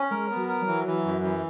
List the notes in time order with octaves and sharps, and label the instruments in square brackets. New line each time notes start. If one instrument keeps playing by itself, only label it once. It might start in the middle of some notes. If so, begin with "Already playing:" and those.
Already playing: [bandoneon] C#4
[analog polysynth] G#3 [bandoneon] A#4
[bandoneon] B3
[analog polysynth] F#3
[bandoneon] A#4
[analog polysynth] F#3
[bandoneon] E3
E3
F#2
E3